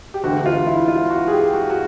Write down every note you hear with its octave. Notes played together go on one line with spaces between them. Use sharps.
G4
E1 D2 D3 F#4
F4
E4
F4
F#4
G#4
G4
F#4
F#4